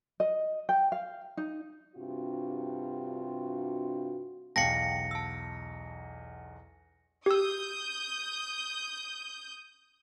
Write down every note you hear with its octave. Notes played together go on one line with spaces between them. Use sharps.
D#5
G5
F5
D#4
G2 C3 D4 F4 F#4
B1 E2 F5 G5 A5 A#6 C#7
A5 E6
G4 D#6 E6 G6